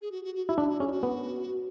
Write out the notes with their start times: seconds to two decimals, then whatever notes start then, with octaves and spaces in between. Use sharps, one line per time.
0.02 G#4
0.12 F#4
0.24 F#4
0.35 F#4
0.47 E4 F#4
0.58 D4 E4
0.69 F#4
0.80 C#4 G#4
0.88 E4
0.92 F#4
1.03 B3